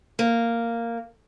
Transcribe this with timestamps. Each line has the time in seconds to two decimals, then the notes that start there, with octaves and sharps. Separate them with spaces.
0.19 A#3